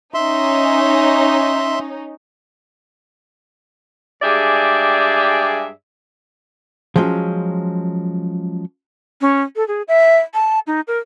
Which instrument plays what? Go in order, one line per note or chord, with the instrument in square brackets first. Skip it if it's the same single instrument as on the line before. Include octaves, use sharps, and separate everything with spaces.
[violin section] C#4 D#4 [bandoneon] E5 C6
[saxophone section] G2 G#3 G4 G#4 D5 E5
[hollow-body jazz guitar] F3 F#3 G#3 C#4
[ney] C#4
A4
G#4
E5
A5
D#4
A#4